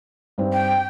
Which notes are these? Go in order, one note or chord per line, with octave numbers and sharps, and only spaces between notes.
G2 C4 D#4
G5